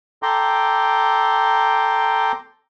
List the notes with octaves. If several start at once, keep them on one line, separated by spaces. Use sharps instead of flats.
A4 G5 A#5 C6 D6